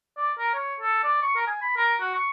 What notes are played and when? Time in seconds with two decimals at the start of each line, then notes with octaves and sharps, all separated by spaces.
0.17 D5
0.38 A#4
0.54 C#5
0.80 A4
1.04 D5
1.22 C#6
1.36 A#4
1.47 G#5
1.62 B5
1.77 A#4
2.01 F#4
2.14 C#6